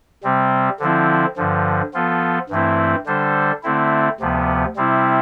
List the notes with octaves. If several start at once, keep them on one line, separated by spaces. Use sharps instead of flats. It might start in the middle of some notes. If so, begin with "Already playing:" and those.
C3 G3 C4
D3 F3 C4 E4
G2 D3 F3
F3 B3 F4 A4
G2 E3 A3 C4 E4
D3 G3 D4 A4 C5
D3 A3 C4 E4
D2 C3 F3 B3
C3 G3 C4 E4